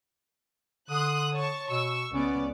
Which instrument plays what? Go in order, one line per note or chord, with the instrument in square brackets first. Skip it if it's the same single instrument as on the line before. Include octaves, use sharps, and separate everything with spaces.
[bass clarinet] D3 [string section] C6 D#6 F#6
[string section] C#5 A5 C#6
[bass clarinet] B2 [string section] C#6 E6
[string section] C#2 B3 D5 [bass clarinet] C#4